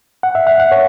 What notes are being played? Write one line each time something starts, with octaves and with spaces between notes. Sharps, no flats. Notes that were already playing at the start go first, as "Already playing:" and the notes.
F#5
E5
F#5
F#5
C#5